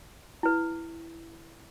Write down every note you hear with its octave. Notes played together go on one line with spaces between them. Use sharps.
E4 B4